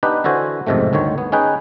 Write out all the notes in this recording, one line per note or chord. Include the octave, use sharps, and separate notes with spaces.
B3 D4 D#4 G4 B4
D3 E3 E4 F#4 C5 G#5
A1 F2 G#2 C3 D#3 A3
G1 D2 D#3 C#5
B3
C#4 D#4 G#4 B4 G5